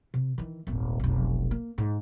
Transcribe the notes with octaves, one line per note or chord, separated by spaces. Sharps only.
C3
D#3 E3
D#1 G#1
F1 B1
A#3
G#2